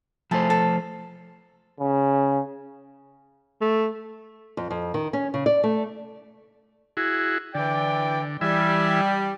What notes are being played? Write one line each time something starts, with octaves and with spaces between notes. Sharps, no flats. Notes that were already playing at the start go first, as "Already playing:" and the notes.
F3 A3 E4 G#4 C5 A5
A4
C#3
A3
F2
F2
D#3
C#4
C#3
D5
A3
E4 F#4 G#4
D3 E3 D5 G5
E3 G3 E5 G#5